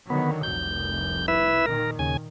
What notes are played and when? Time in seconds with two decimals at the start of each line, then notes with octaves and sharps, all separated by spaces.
0.10 D3 D#3 F#3 B3
0.43 F1 C2 G6
1.28 E4 B4 E5
1.66 A#2 D#3 A#4
1.99 D#2 C#3 G#5